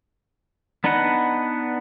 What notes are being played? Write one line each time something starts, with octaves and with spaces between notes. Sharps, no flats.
B3 D4 D#4 B4 F#5